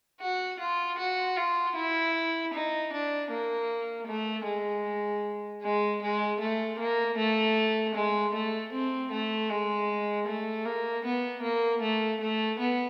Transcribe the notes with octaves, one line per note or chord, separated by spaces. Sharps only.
F#4
F4
F#4
F4
E4
D#4
D4
A#3
A3
G#3
G#3
G#3
A3
A#3
A3
G#3
A3
C4
A3
G#3
A3
A#3
B3
A#3
A3
A3
B3